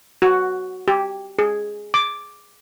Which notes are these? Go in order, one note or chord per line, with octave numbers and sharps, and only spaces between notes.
F#4
G4
G#4
D6